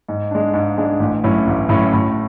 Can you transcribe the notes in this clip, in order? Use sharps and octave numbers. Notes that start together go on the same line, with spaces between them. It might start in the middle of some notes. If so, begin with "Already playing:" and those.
G#2
G#3 D4
G#2
G#3 D4
A1
A2 F#3 C#4 E4
A1
A2 F#3 C#4 E4
A2